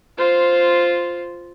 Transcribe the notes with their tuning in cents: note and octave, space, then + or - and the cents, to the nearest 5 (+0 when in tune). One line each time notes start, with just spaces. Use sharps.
F4 +0 C5 -5